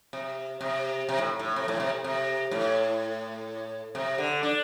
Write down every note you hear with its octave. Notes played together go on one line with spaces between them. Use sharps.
C3
C3
C3
A2
A2
C3
A2
C3
C3
A2
C3
D3
D4